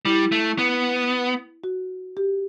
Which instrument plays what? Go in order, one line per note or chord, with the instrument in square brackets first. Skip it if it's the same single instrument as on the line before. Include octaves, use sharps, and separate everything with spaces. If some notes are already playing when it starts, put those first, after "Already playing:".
[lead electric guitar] G3 [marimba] E4
[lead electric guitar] A3
B3
[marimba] F#4
G4